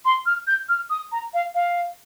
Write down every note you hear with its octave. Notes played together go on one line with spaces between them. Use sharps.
C6
F6
G6
F6
D#6
A#5
F5
F5